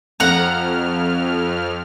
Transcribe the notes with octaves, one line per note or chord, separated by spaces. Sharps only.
F2 F#5 A#5 F6